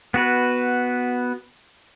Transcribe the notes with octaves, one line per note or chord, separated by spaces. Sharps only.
B3 F#4 B4